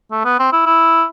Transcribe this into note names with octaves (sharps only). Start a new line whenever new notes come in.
A3
B3
C4
E4
E4